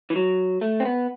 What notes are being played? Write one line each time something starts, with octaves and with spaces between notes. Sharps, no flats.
E3
F#3
A3
C4
B3